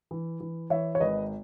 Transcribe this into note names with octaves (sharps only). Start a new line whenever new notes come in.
E3
E3
E3 C#5 E5
C#5
G#1 B4 D#5